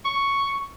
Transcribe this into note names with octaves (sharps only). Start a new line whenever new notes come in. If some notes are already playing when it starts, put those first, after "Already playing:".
C#6